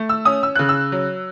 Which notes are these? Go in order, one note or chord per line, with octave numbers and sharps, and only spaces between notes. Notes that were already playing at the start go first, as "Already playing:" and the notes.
Already playing: A3
E6
C#4 D#6
E6
C#3 F#6
E6
F#3